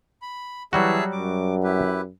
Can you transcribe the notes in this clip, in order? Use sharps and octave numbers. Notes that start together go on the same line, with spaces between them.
B5
E3 F#3 G3 F#4 G#4 E5 A5
F#2 D6
E4 G4 B4